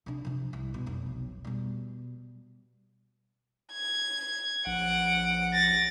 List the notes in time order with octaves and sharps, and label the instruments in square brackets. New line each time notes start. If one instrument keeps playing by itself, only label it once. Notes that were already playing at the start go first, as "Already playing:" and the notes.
[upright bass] C3 D4
C3 F3
C2
B2
F1 B1
B2 G3
[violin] G#6
[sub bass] A#1 [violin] F#5 D7
[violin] A6 A#6